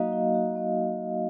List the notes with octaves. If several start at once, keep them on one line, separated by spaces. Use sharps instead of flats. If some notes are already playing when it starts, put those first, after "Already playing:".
Already playing: F#3 A#3 D#4 F#4 D#5 F5
D#4
F#4
A#3